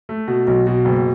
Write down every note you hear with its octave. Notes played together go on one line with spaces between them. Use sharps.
A3
B2
B1
B2
F#1